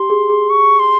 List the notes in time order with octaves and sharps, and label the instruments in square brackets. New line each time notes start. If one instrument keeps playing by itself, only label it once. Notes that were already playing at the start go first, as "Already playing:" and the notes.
Already playing: [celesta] G4 [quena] C6
[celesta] G#4
G#4
[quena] C#6
C6